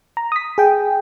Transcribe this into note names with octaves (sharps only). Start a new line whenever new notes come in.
A#5
D#6 B6
G#4 G5